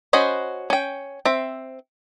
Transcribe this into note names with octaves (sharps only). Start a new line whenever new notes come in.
C#4 F#4 C5 D#5 B5
C#4 G5
C4 E5